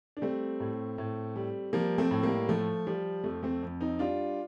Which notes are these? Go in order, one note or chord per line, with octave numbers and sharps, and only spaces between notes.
D4
G3 A3 C4
A2
A2
G3
F3 G3 A#3
A3 C4
A2
G3 A#3
F3 A3
F3 G3
F2 A3
A3 C4
F2
C4 D#4
G3 D4 F4